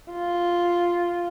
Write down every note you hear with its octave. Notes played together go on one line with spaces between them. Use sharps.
F4